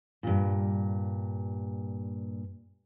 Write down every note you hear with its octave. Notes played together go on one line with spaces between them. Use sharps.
G2 A#2